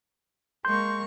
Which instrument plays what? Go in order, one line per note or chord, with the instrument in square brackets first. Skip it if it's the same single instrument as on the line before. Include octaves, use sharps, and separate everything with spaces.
[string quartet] G#3 A#3 C#6 [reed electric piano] C6 G6